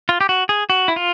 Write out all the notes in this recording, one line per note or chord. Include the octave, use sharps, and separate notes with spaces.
F4
G4
F#4
G#4
F#4
E4
F4